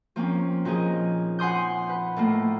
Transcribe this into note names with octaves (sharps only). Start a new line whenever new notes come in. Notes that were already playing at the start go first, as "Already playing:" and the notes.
F3 A#3 C4 C#4
A#2 F3 D#4 G#4
F#5 G#5 C6 D#6 G6
B4
A2 A3 A#3